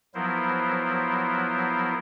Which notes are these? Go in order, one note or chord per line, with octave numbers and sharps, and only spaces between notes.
F3 F#3 B3 E4 A#4 C5